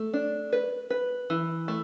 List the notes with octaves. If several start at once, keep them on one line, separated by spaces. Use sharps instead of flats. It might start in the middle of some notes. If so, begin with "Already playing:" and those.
Already playing: A3
D4
B4
B4
E3
A3